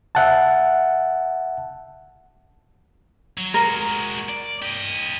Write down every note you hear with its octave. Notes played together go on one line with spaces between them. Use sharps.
E5 F#5 A5
F#3
G#3 F#4 A#4
D5
G4 D#5